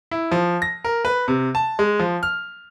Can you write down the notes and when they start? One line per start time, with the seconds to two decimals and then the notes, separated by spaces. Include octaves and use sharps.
0.11 E4
0.31 F3
0.62 A#6
0.84 A#4
1.05 B4
1.28 C3
1.55 A5
1.79 G#3
1.99 F3
2.23 F6